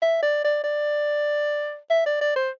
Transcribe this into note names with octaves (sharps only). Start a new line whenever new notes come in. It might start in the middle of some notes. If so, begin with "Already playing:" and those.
E5
D5
D5
D5
E5
D5
D5
C5